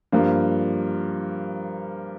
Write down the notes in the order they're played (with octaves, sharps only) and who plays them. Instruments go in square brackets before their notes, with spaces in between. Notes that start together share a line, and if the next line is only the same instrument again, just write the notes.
[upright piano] G2 F3 A#3